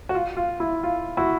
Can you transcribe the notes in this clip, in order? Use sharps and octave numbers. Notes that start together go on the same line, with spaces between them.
F#4
F4
F4
E4
F4
E4 F#4